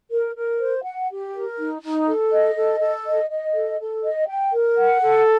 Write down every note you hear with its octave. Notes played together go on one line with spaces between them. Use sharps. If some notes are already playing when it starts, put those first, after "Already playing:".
A#4
A#4
C5
F#5
G4
A#4
D#4
D#4
A4
D#5
A4
A4
D#5
D#5
A4
A4
D#5
G5
A#4
F#5
A4